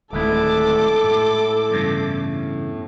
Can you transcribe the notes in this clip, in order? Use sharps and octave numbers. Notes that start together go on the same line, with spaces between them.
D1 D#3 G#3 A3 E4 A4 D6
A2
E2 G2 C#3